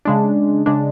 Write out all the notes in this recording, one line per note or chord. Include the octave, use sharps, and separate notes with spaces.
C#3 G#3 D4
C#3 G#3 D4